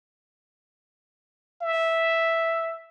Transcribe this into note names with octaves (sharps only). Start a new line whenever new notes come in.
E5